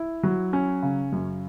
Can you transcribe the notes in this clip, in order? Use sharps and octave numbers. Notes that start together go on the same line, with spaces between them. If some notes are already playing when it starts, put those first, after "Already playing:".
Already playing: E4
F#3
C#4
C#3
F#2